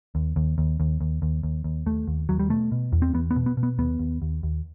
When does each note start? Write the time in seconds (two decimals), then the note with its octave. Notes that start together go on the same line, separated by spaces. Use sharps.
0.15 D#2
0.36 D#2
0.58 D#2
0.80 D#2
1.01 D#2
1.22 D#2
1.43 D#2
1.64 D#2
1.86 D#2 A3
2.07 D#2
2.29 D#2 F#3
2.39 G3
2.50 B2 A3
2.72 B2
2.92 E2
3.02 C4
3.14 E2 B3
3.31 B3
3.36 B2
3.46 B3
3.57 B2
3.63 B3
3.78 D#2 B3
3.99 D#2
4.22 D#2
4.43 D#2